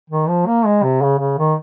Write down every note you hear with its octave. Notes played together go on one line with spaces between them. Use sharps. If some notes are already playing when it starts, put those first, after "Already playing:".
D#3
F3
A#3
G#3
C3
C#3
C#3
D#3